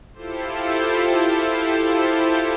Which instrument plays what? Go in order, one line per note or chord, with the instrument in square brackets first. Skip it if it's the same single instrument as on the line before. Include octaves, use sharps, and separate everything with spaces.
[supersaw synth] E4 F4 G4 A4 C5